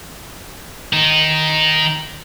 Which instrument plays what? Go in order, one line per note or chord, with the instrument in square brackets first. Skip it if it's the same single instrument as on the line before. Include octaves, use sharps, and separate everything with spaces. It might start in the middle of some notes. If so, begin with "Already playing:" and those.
[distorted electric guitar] D#3 D#4